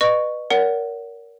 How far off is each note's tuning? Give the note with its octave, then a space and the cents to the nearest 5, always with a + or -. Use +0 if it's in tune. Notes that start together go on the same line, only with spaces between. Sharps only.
B4 +0 D#5 -35 C#6 +0
A#4 +5 C#5 +45 F#5 +10